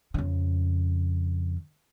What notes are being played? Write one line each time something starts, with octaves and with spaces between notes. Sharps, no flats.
F2 C#3